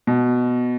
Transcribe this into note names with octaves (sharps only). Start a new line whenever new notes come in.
B2